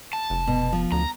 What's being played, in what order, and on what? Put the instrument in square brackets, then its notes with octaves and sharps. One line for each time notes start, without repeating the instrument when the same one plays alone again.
[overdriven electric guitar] A5
[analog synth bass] F1
[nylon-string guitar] B2
F3
[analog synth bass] D2 [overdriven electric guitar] A#5